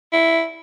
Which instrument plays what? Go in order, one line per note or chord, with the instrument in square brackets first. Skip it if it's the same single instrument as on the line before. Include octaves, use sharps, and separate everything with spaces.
[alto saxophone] E4